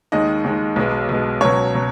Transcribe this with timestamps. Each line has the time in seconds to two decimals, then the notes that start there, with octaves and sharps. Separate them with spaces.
0.12 D#2 D#3 G#3 D#5
0.44 D#2 D#3 G#3
0.76 B1 B2 G#3
1.09 B1 B2 G#3
1.40 C#2 B2 F#3 C#5
1.74 B2 F#3